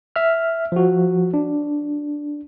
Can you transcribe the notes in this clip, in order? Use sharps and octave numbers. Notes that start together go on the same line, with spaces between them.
E5 F6
F3 F#4
D4